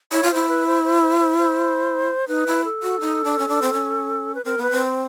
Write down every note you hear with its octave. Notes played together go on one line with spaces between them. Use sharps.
E4 C#5
F4
E4 C5
B4
C5
C5
C5
C5
C5
D#4 B4
E4
A4
F#4
D#4
D4
C#4
D4
C4
C#4
B4
C4 A#4
B3 B4
C4